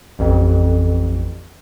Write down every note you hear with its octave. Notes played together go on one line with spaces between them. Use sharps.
A1 F2